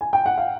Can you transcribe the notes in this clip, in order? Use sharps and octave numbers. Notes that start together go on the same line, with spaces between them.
G#5
G5
F#5
F5